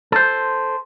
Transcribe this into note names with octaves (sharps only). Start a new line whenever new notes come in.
A4 C5